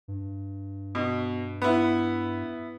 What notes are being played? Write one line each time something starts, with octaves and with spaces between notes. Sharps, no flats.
G2
B2
B3 E4